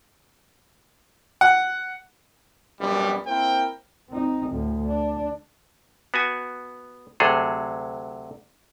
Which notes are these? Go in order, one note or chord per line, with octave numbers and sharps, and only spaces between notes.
F#5
A#1 F#2 B2 G3
A#3 C4 E4 A#4 C5 G5
C4 D#4
D2 A2
D4
B3 F#4 G#5
D2 C3 F#3 G#4 A4